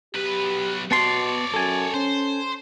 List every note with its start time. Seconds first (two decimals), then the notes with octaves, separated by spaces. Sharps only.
0.15 B1 G4 B4
0.91 B2 B3 C#5 D5 A5 C6
1.54 F#2 A4 G#5
1.94 C#4 C5